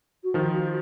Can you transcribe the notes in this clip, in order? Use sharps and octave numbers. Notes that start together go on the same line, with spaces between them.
F#4
D#3 F3 F4
F#4